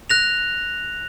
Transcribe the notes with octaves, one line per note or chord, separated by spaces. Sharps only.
F#6 A#6 F7